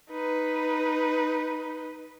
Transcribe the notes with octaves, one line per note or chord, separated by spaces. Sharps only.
D#4 B4